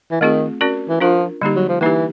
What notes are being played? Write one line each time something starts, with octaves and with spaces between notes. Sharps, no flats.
E3
D#3 A3 C4 F4 G#4
C#4 F#4 A#4 D5
E3
F3 D4 F4 A#4
D3 G3 A#3 D#4 G4
F#3
F3
E3 A#3 D#4 G4